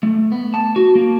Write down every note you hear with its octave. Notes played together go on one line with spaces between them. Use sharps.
A3
B3
A5
F#4
A#3